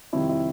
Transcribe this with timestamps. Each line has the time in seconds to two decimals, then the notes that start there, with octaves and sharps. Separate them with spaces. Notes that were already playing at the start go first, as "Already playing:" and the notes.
0.13 F2 C3 D#3 G3 E4
0.29 E4